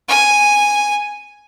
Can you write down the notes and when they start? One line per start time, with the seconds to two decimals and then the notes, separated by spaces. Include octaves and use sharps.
0.08 G#5